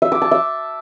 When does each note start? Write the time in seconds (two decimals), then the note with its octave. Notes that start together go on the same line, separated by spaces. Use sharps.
0.02 E5
0.12 D6
0.22 A5
0.31 E5